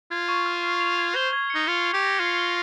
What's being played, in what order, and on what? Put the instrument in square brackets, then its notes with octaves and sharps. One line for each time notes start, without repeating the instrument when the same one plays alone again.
[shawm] F4 [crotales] G#6
[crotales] C#6
F6
C7
F7
G#6
[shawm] C5 [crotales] G7
[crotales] G#6
[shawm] D#4 [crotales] C#7
[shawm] F4 [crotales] C#7
[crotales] F7
[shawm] G4
[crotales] A#6
[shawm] F4 [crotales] C7
[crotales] G7